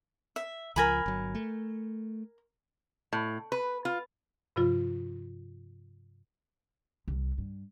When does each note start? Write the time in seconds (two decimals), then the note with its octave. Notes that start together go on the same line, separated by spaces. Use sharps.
0.36 E5
0.76 C#2 F3 A#4 G#5 B5
1.06 G1 F#3
1.35 A3
3.13 A2
3.52 B4
3.85 F4
4.56 G2 C3 F3 F4
7.08 C2
7.38 G2